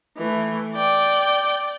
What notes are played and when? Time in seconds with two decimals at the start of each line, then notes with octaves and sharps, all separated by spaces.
0.18 E3 A3
0.76 D5 G5